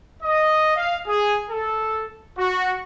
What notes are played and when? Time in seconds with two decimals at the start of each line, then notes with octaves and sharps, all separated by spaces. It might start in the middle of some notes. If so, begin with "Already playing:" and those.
0.23 D#5
0.77 F5
1.07 G#4
1.51 A4
2.38 F#4